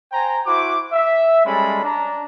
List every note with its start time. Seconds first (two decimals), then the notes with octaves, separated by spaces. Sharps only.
0.12 C5 G5 G#5 A#5
0.46 E4 F#4 C5 D6
0.92 E5
1.45 G3 G#3 C#4 A4 B5
1.84 D4 A#5